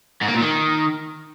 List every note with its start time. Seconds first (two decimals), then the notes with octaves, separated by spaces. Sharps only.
0.21 G#2
0.28 A#3
0.34 A#2
0.41 D#3